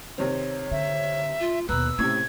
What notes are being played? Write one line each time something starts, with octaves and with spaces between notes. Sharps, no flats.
C3 D#3 C4 C#5
D3 E5
F4
D#2 B2 B4 A#5 E6 F#6
A2 C3 C#4 G#6